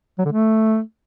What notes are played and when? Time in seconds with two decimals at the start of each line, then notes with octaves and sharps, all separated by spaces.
0.18 F#3
0.25 D3
0.32 A3